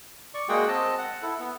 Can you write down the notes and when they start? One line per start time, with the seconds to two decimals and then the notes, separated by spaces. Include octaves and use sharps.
0.34 D5 C#6
0.49 G#3 A#3 F#4 G#4 F#5 G5
0.68 C4 D#5 A5
0.98 F#5
1.22 E4 A4
1.40 B3